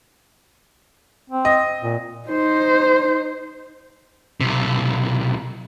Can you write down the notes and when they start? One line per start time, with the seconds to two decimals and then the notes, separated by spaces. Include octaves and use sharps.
1.30 C4
1.45 D#5
1.82 A#2
2.29 D#4 C5
4.41 B1 C3